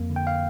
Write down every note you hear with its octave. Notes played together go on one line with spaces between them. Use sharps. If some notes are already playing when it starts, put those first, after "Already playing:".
Already playing: F2 A#3
D3
G5
F5